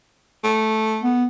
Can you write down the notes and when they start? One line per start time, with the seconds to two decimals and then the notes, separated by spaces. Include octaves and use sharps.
0.44 A3
1.03 B3